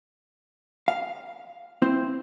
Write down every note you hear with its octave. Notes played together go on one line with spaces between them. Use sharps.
F5
C4 E4 C5